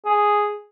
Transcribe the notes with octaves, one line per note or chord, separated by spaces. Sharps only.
G#4